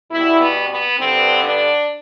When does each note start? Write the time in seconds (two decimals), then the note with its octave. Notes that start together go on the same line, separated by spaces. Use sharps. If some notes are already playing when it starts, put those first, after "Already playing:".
0.11 B2 G3 B3 E4
0.40 B3
0.70 B3
0.99 G2 D3 G3 B3 C4
1.43 D4